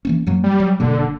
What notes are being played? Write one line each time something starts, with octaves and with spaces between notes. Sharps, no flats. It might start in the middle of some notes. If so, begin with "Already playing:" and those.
E3 A#3 C#4
F#2 F#3 A#3
G3
F#3
F#1 B2 D3 A#3